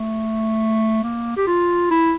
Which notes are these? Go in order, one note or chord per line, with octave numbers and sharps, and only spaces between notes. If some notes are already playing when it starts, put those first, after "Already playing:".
Already playing: A3
A#3
G4
F4
E4